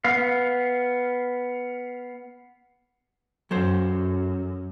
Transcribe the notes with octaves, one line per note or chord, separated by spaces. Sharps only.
B3 F5
F#2 F#3 A4 C5